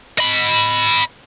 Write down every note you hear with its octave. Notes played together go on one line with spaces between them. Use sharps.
D#5 B5